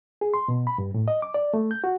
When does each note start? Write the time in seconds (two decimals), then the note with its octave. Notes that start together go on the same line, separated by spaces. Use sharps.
0.21 G#4
0.34 C6
0.48 B2
0.67 B5
0.78 G2
0.94 A2
1.08 D#5
1.22 D6
1.34 D5
1.54 A3
1.71 G6
1.84 F#4